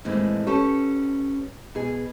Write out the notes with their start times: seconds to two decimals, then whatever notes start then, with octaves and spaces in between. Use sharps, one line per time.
0.05 D#2 A2 E3 G#3 C4
0.47 C#4 G4 A4 B4 C#5
1.75 B2 G#4